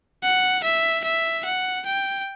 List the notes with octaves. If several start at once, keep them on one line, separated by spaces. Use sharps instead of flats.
F#5
E5
E5
F#5
G5